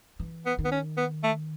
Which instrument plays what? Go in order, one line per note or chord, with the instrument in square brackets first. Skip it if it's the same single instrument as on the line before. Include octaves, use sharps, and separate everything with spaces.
[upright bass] E3
[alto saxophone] B3
[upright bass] D#3
[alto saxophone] B3
C#4
B3
A3